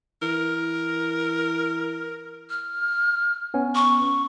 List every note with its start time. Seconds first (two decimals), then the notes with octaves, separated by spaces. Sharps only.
0.22 E3 A#4
2.50 F6
3.54 B3 C#4
3.75 C#6